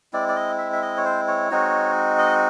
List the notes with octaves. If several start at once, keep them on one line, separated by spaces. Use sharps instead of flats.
G#3 C4 E4 D5
D5
D#5
E5
E5
D#5
C#5
C5
C#5
G#3 C4 D#4 F#4
D#5